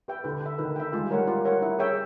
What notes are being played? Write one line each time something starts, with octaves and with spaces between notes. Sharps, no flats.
G4 B4 E5 G5
D3 B4
E5 G5
D#3 B4
E5 G5
G#3 F4
G3
G#3 A#4 C#5 F#5
F4
A#4 C#5 F#5
E4
G#4 C#5 E5 G5